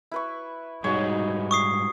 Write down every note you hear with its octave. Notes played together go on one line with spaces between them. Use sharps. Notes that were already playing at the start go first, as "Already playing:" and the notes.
E4 B4 C#6
G#2 G3 D#4 F#4 G#4 C#5
C#6 D#6 C7